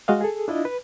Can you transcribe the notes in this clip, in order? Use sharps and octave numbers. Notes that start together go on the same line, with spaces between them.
G#3 F#4 D#5 F5
G#4 A4
D4 E4 F4 D#5
B4